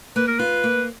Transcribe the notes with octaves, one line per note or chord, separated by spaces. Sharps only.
A#3 B4
A#4
F4 B4
A#3